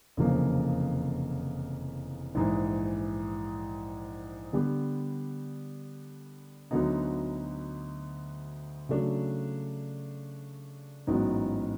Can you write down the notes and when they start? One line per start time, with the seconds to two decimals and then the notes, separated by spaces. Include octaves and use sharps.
0.17 F1 E2 C#3 F3 A#3
2.35 A#1 G#2 E3
4.53 D3 G3 B3 D4 G4
6.71 D2 D3 F#3 B3 D#4
8.89 C#3 F#3 A3 D4
11.07 A1 G#2 D#3 F#3 B3